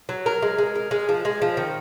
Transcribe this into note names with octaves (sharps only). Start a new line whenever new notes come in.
F#3
A#4
G#3
G#3
A#4
G#3
F3
G#3
F3
D#3